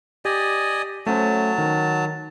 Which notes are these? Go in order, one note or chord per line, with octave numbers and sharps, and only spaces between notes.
G4 D5 D#5 G#5
F#3 A3 C#4 C5 A5
D#3